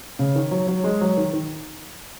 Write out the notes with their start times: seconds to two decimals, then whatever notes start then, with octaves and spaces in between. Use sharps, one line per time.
0.19 C#3
0.36 D#3
0.51 F#3
0.67 F#3
0.84 G#3
1.01 F#3
1.17 D#3
1.33 D#3